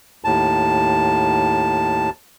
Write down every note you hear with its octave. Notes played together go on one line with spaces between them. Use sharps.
D#2 A2 A5